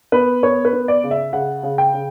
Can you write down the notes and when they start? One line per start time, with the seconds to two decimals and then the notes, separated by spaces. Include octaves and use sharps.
0.12 B3 B4
0.43 B3 C#5
0.65 B4
0.73 B3
0.88 D5
1.04 C#3
1.11 E5
1.33 C#3 F#5
1.63 C#3
1.78 G5
1.94 C#3